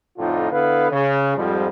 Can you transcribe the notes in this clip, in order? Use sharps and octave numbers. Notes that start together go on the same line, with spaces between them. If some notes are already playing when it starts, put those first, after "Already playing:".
F2 A2 D3 D#4 F4
D3 B3 E4 B4 F5
C#3
F2 G#2 F3 G3